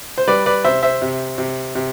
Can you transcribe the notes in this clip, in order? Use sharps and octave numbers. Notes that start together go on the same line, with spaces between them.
C5
G3 B4 D5
B4 D5
C3 C5 E5
C5 E5
C3
C3
C3